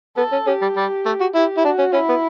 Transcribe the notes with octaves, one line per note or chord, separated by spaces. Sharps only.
B3 A4
C#4
C#4 G4
G3
G3
A3
F#4
E4 G4
E4
D4 F#4
C#4
C#4 E4
B3